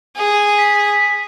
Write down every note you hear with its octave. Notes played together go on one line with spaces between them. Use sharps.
G#4
B6